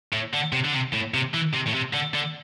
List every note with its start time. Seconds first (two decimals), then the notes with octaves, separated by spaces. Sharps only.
0.13 A2
0.33 D3
0.53 C3
0.65 D3
0.74 C3
0.94 A2
1.14 C3
1.34 E3
1.54 C3
1.68 A2
1.74 C3
1.94 D3
2.14 D3